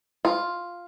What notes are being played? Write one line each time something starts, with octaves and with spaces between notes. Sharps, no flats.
F4